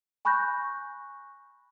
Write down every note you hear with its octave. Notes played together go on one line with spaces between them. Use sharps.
G#5 B5 C#6 F#6 G6 A#6